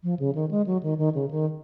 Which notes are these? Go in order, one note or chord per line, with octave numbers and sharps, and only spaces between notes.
F3
C#3
D#3
G#3
F#3
D#3
D#3
C#3
D#3